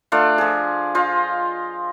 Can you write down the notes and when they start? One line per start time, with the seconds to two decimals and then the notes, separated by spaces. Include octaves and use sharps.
0.12 A3 D4 F4
0.38 F3 G#4
0.95 F4 C5 D#5